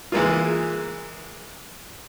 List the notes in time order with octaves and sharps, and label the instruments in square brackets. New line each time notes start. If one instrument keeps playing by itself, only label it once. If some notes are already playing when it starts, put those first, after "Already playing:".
[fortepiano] E3 G#3 A#3 F4